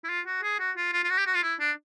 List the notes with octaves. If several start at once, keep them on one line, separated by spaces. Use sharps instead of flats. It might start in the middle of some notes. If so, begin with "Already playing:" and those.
E4
F4
F#4
G#4
F#4
F4
F4
F4
F#4
G4
F#4
F4
E4
D4